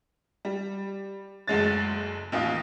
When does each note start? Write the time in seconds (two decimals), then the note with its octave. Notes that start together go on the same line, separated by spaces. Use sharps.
0.45 G3
1.48 F#1 D2 G#3 A6
2.32 A1 D#2 F4 D#6